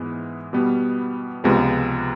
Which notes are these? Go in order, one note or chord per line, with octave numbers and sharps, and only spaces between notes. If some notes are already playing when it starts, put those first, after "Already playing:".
Already playing: G#2 E3 G#3 B3
B2 G3 B3
C#2 C3 F3 G#3 B3